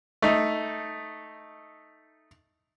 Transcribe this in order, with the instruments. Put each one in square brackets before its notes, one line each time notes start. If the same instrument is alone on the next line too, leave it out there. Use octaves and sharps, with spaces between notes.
[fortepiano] A3 D#4